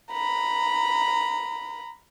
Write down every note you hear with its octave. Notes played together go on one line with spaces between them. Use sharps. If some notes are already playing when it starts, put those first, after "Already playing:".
A#5 B5